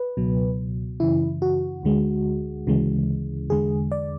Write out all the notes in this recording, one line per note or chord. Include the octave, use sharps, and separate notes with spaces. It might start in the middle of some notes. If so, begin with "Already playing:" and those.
Already playing: B4
C#2 B2 F#3
F#2 C#3 E3 E4
F#4
D2 D3 G#3
D2 C#3 E3 G#3
E2 D3 G#3 G#4
D5